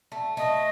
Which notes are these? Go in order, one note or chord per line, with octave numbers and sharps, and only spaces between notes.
A3
A3 D#5